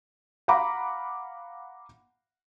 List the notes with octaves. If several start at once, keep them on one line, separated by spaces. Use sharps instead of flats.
F5 F#5 A#5 B5 D6